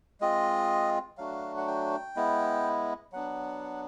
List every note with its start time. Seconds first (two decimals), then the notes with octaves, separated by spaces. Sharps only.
0.21 G#3 C4 F4 D#5
1.18 F#3 A3 D4 F#4 F5
1.57 F#5
1.67 G5
2.16 G#3 B3 E4
3.12 F#3 B3 D4 F#5